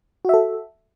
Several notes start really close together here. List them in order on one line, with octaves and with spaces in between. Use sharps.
F#4 E5 A4